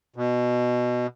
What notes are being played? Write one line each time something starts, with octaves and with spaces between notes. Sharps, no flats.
B2